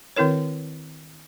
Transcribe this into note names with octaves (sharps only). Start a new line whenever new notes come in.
D#3 C4 E4 A#4 C#5